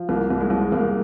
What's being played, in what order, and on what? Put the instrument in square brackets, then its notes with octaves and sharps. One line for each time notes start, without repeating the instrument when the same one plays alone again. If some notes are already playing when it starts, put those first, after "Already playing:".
Already playing: [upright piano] F3
C2 A#3
C2
G#3
C2
C2 A#3